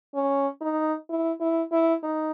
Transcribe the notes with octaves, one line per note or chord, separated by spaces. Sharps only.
C#4
D#4
E4
E4
E4
D#4